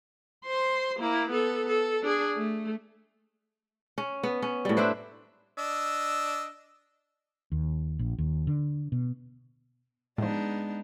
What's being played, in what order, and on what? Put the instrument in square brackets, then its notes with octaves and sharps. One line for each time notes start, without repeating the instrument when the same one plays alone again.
[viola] C5 C6
A#3 E4
B3 A4
A4
D4 G#4
A3
[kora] C#4
B3
C#4
A2 G3
D4 E4 B4 C5
[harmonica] D4 D#5 E6
[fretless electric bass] D#2
A#1
D#2
D3
B2
[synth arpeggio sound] A2 F3 [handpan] G#3 [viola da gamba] B3 D4 D#4